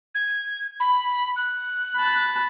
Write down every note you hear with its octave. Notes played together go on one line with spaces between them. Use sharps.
G#6
B5
F#6
A5 B5